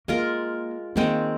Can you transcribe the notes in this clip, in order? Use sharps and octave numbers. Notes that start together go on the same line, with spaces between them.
G#3 A#3 F4 A#4
D#3 G#3 A#3 C4